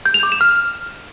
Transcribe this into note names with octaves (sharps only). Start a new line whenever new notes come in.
G6
F7
D6
E7
F6